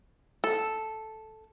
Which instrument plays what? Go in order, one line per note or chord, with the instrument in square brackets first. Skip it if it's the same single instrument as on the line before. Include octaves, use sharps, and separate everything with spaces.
[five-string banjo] A4